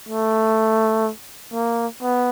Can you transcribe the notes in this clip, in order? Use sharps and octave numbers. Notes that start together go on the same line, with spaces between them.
A3
A#3
B3